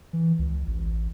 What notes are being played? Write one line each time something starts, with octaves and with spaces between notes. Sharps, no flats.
E3
C#2
A1